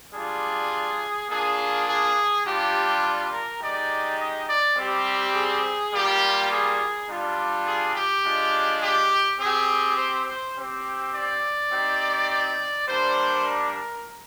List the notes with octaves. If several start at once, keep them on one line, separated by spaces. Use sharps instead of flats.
G3 D4 F4 G#4
A#3 D4 F4 G#4
G#4
G3 D4 F4 G4
A#4
G#3 D#4 G4 D5
D#5
D5
G3 C4 G4
G#4
G3 A#3 F4 G4
G#4
G3 D4 F4
G#4
G4
G#3 D4 F4
G4
C4 G4 G#4
C5
C5
C4 G4
D5
C4 D#4 G4
D5
G3 A#3 D4 C5
A#4